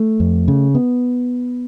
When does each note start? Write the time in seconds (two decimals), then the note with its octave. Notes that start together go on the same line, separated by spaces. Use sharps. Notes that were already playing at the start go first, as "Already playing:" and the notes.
Already playing: A3
0.20 F2
0.48 C#3
0.75 B3